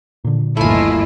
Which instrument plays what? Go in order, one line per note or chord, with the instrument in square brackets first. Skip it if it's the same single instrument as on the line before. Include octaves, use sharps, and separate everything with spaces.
[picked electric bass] A#2 D3
[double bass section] G1 D#2 E3 [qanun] A3 G#5 [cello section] E4 F4 D#5